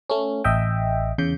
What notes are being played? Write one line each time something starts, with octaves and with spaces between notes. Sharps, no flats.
A3 C#4
A1 D#5 E5 G5
E2 C#3 G6